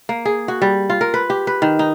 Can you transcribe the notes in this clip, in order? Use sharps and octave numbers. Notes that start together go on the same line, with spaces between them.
A#3
G#4
F#4
G3
F4
A#4
B4
G4
B4
D#3
D#4